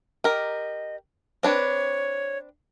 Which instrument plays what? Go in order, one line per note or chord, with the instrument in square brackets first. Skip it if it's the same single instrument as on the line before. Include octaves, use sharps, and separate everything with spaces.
[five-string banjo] G4 A#4 [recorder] D#5
[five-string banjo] C4 D4 B4 [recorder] C#5